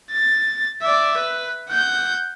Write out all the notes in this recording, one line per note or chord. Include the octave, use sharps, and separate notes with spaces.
A6
D5 E5
B4
F#5 G6